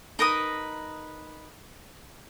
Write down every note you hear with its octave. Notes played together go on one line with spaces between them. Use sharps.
D#4 A#4 B4 D#6